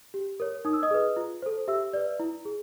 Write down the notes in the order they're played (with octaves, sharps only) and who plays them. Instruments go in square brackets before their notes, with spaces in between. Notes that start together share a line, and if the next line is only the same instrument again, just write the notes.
[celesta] G4
A#4 C#5
D#4 D#6
E6
D#5 D#6
G#4 B4
F4
A4 C5
G4 E5 E6
B4 D5
E4
G#4